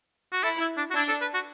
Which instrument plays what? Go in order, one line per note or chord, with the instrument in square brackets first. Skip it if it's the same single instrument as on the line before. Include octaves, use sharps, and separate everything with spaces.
[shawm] F#4
[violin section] E4 [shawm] A4
[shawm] E4
D4
F#4
[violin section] D4 [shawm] E4
[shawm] A4
B4
F#4